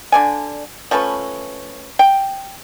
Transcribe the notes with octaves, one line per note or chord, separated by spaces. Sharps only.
D3 D5 G#5
F3 A3 C#4 B4
G5